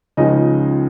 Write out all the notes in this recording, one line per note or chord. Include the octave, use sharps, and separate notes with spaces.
C#2 C#3 F3 D#4 D#5